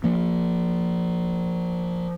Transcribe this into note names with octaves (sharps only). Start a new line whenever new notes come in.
F3 A#3